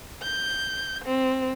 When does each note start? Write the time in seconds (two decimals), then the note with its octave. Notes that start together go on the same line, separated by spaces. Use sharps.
0.23 G6
1.05 C4